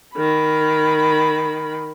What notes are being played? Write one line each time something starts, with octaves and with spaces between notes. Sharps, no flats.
D#3 B5